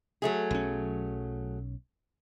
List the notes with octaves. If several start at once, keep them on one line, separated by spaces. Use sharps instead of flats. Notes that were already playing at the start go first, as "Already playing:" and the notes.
F#3 A3 G#4
B1 C#4